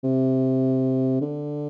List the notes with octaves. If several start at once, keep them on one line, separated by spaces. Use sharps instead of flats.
C3
D3